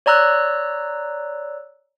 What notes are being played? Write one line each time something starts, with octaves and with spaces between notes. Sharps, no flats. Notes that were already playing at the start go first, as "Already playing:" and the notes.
C#5 D5 A#5 E6 F#6